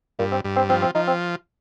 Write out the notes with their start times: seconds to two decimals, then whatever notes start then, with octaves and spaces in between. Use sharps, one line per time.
0.19 G2 A#2
0.32 C4
0.44 G2
0.56 C4
0.69 F3 C4
0.82 C4
0.95 F3 D#4
1.07 C4